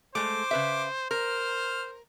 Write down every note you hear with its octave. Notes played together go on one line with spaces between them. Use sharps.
G#3 A3 C5 D6
C#3 B4 E5
A#4 C5 F6